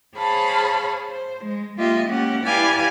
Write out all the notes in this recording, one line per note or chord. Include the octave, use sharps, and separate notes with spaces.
G#4 C5 C#5 F5 A5 B5
C5
G#3
G#3 A#3 F4 G4 D#5 E5
A#3 C#4 G4 F#5
E4 G4 B4 D5 F5 G#5